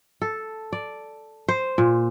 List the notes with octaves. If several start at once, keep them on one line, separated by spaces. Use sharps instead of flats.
A4
D5
C5
A#2